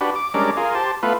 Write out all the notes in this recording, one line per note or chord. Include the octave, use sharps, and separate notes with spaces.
D4 F#4 G4 B4
D6
G3 G#3 C#4 D4 A#4 D6
F4 G#4 A#4
G4 C5 A5
A3 B3 F4 B4